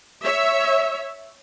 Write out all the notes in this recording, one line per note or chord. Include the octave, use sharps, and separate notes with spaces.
C#5 E5